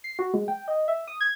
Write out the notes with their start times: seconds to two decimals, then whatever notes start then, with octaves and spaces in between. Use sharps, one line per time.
0.04 C7
0.19 F#4
0.34 G#3
0.48 G5
0.68 D#5
0.88 E5
1.08 D#6
1.21 G#6